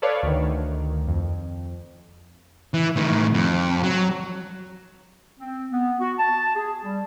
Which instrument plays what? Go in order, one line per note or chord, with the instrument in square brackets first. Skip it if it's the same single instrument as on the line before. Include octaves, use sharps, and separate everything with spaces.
[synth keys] A4 B4 C#5 D5 F5
D2 D#3
F2
[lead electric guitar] E3
A2 D#3
F2
F#3
[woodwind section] C4
B3
F#4
A5
G#4
G3